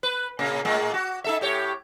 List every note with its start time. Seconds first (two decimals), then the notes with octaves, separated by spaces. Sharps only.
0.03 B4
0.39 A#2 C#3 A#3
0.65 A2 G#3 A#3
0.94 F#4
1.24 D#4 A4 E5
1.41 A2 G4 C#5